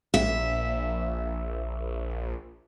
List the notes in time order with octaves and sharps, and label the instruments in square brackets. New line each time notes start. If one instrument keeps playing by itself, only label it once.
[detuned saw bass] A#1 [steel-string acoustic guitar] E5